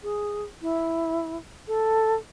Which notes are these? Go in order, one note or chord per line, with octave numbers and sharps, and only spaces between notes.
G#4
E4
A4